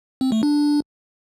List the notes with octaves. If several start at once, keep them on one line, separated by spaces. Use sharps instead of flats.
C4
A3
D4